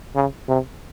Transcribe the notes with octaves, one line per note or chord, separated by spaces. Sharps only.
C#3
C3